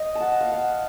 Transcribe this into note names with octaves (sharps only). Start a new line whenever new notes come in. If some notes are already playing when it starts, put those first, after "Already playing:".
Already playing: D#5
A5
F#5
F5
F#5